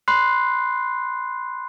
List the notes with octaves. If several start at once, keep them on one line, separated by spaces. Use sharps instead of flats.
B5 C6 F#6 C7